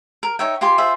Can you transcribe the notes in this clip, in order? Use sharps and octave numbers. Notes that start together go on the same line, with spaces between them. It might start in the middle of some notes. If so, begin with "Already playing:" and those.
A#4
D#4 C#5 E5 G5
F4 G4 G#5 C6
F4 G#4 C5 E5